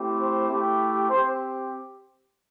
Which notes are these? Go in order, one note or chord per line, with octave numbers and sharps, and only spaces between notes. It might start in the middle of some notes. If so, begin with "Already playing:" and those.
Already playing: A3 C4 E4 G4
C5
A3 E4 G4
C4 G4 C5